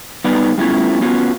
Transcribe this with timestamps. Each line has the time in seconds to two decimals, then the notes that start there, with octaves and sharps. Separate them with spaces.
0.24 G3 B3 D#4 B4 D5 F5
0.58 G3 A3 B3 C#4 E4 F4
1.01 B3 C#4 F4 F#4